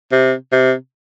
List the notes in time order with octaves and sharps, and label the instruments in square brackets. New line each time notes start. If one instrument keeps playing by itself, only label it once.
[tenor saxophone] C3
C3